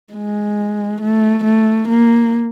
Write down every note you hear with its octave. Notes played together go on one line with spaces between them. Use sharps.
G#3
A3
A3
A#3